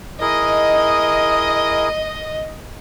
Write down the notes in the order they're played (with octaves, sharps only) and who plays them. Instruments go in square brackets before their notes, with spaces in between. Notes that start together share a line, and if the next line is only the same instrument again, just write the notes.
[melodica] E4 G#4 A#4 [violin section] D#5